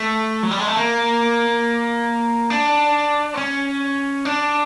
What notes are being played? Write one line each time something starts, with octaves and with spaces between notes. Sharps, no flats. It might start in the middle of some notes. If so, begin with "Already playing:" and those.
Already playing: A3
F#3
G3
G#3
A3
A#3
D4
C4
C#4
D4